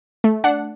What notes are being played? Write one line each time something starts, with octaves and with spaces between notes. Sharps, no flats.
A3
D4 F#5